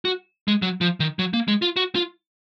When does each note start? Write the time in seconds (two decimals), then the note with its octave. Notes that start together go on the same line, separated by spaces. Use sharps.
0.05 F#4
0.48 G#3
0.62 F#3
0.81 F3
1.00 D#3
1.19 F#3
1.33 A#3
1.48 G#3
1.62 F4
1.76 F#4
1.95 F4